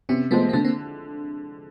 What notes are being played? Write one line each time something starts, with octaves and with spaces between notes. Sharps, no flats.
C3 B3 C#4
F3 G#3 A3 B3 C4
A#3
D3 A3 B3
A#3 C4